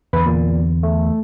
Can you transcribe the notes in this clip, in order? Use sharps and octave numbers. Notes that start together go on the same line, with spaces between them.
E2 D3 B4
A#2
A3